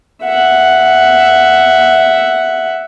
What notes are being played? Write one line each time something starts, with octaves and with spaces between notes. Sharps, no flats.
E5 F#5